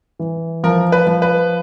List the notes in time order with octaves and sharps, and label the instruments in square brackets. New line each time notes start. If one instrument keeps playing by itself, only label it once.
[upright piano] E3
[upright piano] F3 [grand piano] A#4
[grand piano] B4
[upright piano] F3
[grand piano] B4